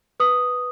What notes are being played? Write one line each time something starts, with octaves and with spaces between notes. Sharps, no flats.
B4 D#6